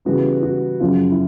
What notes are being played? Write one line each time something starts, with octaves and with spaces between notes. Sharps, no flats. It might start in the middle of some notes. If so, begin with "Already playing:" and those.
C#3 E3 G3 B3 F#4
F#4
F#2 C#3 F3 F4
E4